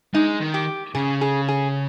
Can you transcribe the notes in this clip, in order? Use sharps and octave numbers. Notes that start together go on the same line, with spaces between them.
G#3 D#4
D#3
G4
C#3 G#4
G#4
G#4